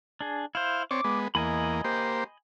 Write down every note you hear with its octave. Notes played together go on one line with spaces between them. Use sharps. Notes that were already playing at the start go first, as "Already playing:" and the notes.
D4 G#4
E4 C5 F5
C4 C#5 D5 D6
G#3 B3
E2 A#3 D#5 G#5 B5
A#3 G4 C5